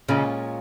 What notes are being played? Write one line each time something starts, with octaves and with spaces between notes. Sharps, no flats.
A#2 C#3 G#3 C#4 F4